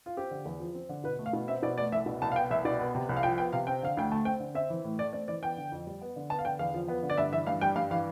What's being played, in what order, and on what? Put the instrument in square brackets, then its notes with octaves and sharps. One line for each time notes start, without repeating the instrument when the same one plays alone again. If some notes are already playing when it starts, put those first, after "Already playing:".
[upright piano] F4
C4 G4
D3
E2
F3
C4
D3
B2 B4
A3
F5
B2
C4 E5
B2 D5
A3 D5
C2 E5
B2
C2 A5
F5
B3 G5
C2 E5
B2 D5
B3
C3
C2
F5
F3 G5
B3 G5
C3 F5
C4 G5
D3 F5
D2 G5
A3 A5
C4 G5
D3
C4 E5
E3
A2
A3 D5
C4 D5
E3 D5
B3 G5
D3
F2
G3
B3
D3
B3 A5
F5
D3 G5
E2 F5
F3
B3
D3
D5
G2 E5
E3 E5
G2 F5
G3 G5
G2 F5
E3 F5